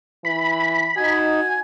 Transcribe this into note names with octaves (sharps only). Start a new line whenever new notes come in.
E3 B5
D#4 F#4 G#5